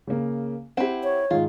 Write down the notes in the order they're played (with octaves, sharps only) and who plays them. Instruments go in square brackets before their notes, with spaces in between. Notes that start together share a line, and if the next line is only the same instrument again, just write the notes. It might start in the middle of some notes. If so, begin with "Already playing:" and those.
[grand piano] C#3 A#3
[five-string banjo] C4 E4 [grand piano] G4 F#5
[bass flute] C#5
[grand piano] G#2 D#3 G#3 [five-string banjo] F4